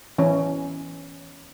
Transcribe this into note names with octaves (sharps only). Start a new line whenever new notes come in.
E3 C#4